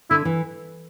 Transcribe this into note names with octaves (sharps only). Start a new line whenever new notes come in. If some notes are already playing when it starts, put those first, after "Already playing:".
D3 E4
E3